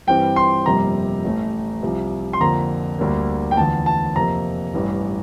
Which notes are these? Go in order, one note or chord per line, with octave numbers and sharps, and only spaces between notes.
G2 E3 G3 C4 G5
C6
G1 F2 C3 G3 A#3 A#5
A1 A2 E3 A3
C2 C3 F3
C6
F2 D3 F3 A#3 A#5
D2 D3 G3 A#3
G5
E2 D3 F3 A3 A5
A5
F2 C3 F3 A#3 A#5
A1 G2 E3